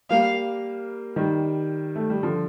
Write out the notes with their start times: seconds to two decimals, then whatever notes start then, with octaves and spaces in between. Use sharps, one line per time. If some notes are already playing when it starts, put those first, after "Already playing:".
0.10 G3 A#3 F5
1.16 D#3 G3
1.96 A3
2.10 G3
2.23 D3 F3